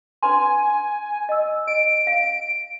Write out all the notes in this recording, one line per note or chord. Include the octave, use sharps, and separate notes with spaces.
D4 B4 G#5 C6
D#5 E6
D#5 D7
F5